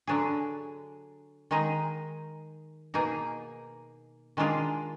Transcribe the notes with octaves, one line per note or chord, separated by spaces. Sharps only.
D3 F#3 D4 G#4
D#3 G#3 D#4 G#4
B2 A#3 D#4 G#4
D#3 G#3 D4 F4 G#4